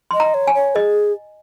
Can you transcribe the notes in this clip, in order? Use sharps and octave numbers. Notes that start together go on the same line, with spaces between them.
D#5 C6
A#5
C#5
G#5
C#5
G#4 D#5